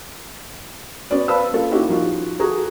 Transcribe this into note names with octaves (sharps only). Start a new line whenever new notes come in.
B3 C#4 F#4 D5
B4 C5 F5 A5 B5 E6
A#3 F4 A4
A#3 C#4 D#4 E4 F#4 G4
F3 D#4 F4 F#4
F#4 G#4 A4 A#5